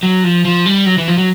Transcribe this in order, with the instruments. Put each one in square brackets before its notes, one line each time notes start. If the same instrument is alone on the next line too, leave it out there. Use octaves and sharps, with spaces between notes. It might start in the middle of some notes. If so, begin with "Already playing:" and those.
[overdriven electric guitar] F#3
F3
F3
G3
F#3
E3
F3
F#3